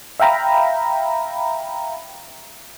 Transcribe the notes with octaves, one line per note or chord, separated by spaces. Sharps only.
E5 F5 G5 A#5 B5